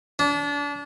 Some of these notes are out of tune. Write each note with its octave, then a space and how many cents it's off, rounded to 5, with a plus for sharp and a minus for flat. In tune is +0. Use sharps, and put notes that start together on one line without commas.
D4 -30